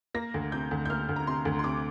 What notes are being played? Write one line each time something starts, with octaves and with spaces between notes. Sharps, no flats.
A#3 A#6
D2
C3 G6
D2
G6
A#3 F6
D2
A#5
C3 C6
D2
C6
C3 D6